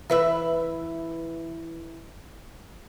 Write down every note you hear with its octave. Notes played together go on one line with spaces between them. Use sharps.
E3 B4 E5